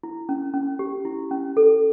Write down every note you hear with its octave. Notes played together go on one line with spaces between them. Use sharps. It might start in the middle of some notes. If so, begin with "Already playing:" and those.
E4
C#4
C#4
G4
E4
C#4
A4